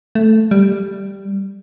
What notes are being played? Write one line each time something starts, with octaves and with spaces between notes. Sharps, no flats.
A3
G3